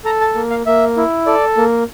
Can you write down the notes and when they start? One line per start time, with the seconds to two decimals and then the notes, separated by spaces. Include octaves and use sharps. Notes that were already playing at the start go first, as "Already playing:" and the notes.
0.04 A4 A#5
0.21 A5
0.35 A#3
0.50 F5
0.66 A#3 E5
0.97 E4
1.26 A4 D5
1.57 A#3